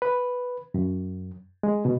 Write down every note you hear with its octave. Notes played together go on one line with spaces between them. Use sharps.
B4
F#2
G#3
B2